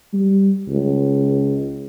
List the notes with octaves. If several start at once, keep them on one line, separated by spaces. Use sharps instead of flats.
G3
C#2